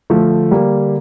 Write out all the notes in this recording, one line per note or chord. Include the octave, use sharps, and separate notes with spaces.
D3 F3 A3
G3 A#3